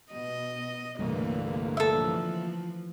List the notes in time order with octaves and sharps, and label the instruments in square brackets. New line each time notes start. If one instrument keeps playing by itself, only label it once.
[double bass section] B2 [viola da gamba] D#5
[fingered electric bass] C2 G2 [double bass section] A#2 D3 A#3 [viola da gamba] E3 A3
[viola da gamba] E3 F3 [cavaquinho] A4 E5